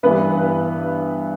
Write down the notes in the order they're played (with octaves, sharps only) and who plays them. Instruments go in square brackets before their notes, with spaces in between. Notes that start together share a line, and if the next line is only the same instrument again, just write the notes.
[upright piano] G2 E3 G3 B3 B4